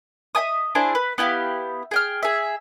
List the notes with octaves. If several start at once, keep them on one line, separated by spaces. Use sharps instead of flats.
D#5 E5 G#5 D#6
D4 E4 G#4 C5
B4
B3 E4 G4 F5
G#4 G5 F6
G#4 E5